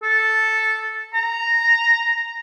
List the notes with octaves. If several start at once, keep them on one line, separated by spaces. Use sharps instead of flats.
A4
A#5